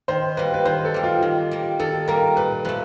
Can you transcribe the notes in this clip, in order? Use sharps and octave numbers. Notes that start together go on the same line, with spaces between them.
D#3 C5
G3 A#3 B4
B4
D#3 C5
A4
G3 A#3
F4
D#3
G3 A#3
D#3 A4
G3 A#3 A#4
A#2 B4
F3 A3 B4